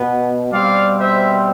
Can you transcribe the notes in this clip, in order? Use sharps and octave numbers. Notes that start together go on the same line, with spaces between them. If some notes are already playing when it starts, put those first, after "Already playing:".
Already playing: B2 B3
B2 G3 C4 D5 F5
C5 E5